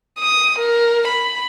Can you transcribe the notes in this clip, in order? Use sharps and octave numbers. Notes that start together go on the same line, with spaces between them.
D#6
A#4
B5